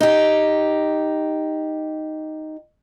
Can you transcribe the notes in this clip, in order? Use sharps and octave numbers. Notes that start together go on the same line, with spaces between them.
D#4 G4